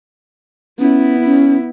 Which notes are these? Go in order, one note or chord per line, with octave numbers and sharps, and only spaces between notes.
B3 C#4 E4
C#4